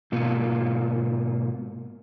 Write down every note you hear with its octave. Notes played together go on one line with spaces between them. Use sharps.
G#2 B2 A#3 F4